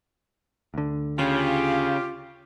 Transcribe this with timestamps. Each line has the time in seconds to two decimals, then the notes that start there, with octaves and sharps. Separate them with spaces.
0.74 D2 D3
1.19 C#3 F4 G4